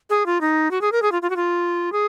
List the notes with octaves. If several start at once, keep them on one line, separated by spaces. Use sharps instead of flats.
G#4
F4
D#4
F#4
G#4
A#4
G#4
F4
F4
F#4
F4
G#4